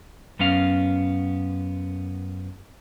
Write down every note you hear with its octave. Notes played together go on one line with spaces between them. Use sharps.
F#2 B3 C#4 F5